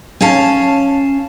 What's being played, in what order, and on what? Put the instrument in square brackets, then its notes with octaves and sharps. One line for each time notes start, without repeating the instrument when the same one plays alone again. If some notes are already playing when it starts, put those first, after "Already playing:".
[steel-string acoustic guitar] C#4 C#5 F5 A5